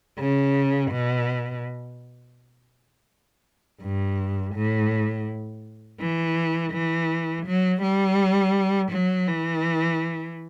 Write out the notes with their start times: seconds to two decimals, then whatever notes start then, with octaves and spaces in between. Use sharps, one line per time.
0.18 C#3
0.91 B2
3.82 G2
4.55 A2
6.00 E3
6.73 E3
7.46 F#3
7.82 G3
8.92 F#3
9.28 E3